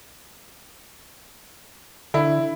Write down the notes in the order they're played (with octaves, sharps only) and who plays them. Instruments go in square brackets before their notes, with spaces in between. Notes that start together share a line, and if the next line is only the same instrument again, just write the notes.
[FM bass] D3 [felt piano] E4